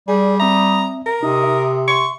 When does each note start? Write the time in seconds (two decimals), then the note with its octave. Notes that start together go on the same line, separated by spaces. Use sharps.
0.08 G3 G#4 D5
0.40 C4 E5 A#5 D#6
1.06 A#4 A#5
1.23 C3 D#4 D#6
1.43 E5
1.88 C6 C#6